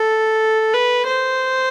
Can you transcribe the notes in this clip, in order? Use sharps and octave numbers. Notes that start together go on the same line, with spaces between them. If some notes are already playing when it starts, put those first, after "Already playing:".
Already playing: A4
B4
C5